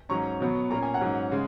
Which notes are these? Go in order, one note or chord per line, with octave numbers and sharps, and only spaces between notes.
G#2 F#3 C#4 A#5 C#6
B2 F#3 B3
A#2 A#3 C#4 A#5
G#5
F#5 A#5
G#2 F#3 C#4
C#3 G#3